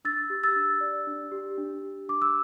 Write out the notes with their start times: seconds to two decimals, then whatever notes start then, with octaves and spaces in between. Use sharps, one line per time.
0.05 D4 E6 A6
0.30 G4
0.43 E6 A6
0.56 D4
0.81 D5
1.07 D4
1.32 G4
1.58 D4
1.83 G4
2.08 D4 D6
2.22 E6